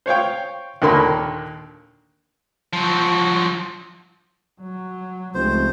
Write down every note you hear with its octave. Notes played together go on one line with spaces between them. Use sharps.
C5 C#5 F5 G5
D#2 A#2 D3 A#3 B5 C6
F3 F#3
F#3
F1 C#2 C4 C5